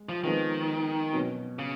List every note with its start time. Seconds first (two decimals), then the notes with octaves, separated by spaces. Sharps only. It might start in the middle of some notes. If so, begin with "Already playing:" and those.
Already playing: G#3
0.09 F3
0.24 D#3 F3 G#3 B3
1.13 B2 F#3 C#4
1.59 C#3